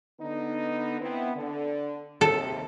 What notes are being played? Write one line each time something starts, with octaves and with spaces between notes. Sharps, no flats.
D3 B3 D#4
B3 C4 E4
D3
D#2 C3 A4